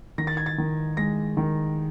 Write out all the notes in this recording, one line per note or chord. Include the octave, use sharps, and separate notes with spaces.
D#3 A#6
A6
G#6
A6
D#3
G#3 A#6
D#3